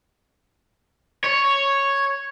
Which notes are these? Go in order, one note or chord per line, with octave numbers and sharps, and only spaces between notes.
C#5